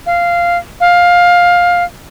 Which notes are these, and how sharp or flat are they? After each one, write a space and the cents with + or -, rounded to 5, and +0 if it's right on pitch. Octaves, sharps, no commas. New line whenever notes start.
F5 -10
F5 +15